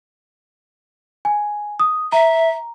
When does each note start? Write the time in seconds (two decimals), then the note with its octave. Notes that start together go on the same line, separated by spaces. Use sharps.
1.25 G#5
1.80 D#6
2.12 E5 A#5